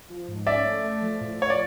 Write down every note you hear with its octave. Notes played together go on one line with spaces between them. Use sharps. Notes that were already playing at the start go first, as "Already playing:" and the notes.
F3
G#2
C#4 D5 E5
A3
A3
F3
A2
F3 C#5
D5